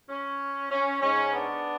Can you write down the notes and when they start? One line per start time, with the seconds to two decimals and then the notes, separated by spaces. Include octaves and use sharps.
0.09 C#4
0.71 C#4
1.01 G#2 G#3 C#4
1.33 B3 D4